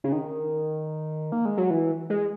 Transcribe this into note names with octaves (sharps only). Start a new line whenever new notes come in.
C#3
D#3
A#3
G#3
F#3
E3
G#3